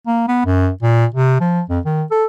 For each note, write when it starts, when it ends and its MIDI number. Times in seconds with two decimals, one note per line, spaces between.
0.07 0.25 58
0.28 0.40 59
0.45 0.69 42
0.82 1.06 46
1.14 1.39 48
1.41 1.62 53
1.70 1.79 41
1.85 2.03 51
2.11 2.25 69